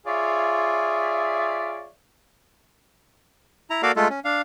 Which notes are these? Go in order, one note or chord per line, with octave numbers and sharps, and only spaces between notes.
F4 G#4 C#5 D5 E5 F5
E4 A#5
A#3 F#4 A4 D5 F5
G#3 A3 F4 A4
C#4
D4 F5